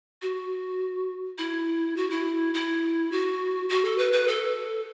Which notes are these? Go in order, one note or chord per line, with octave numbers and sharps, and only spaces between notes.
F#4
E4
F#4
E4
E4
F#4
F#4
A4
B4
B4
A4